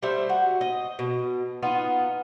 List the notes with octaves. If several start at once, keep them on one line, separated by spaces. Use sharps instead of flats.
G3 A3 C5 E5
F#4
D#5
B2
B3 D#4 F4